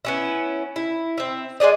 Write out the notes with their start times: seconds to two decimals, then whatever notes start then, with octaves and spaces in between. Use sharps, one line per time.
0.05 B3 C#4 E4
0.76 E4
1.18 C4 E5
1.60 G#3 G#4 D5 D#5